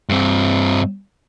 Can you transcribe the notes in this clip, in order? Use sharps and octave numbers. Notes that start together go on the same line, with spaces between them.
G2 C4